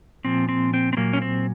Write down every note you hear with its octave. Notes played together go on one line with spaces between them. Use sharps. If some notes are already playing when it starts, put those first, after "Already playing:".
A#2 F3 C4
C4
C4
C4
A#2 F#3 A#3
C#4
C4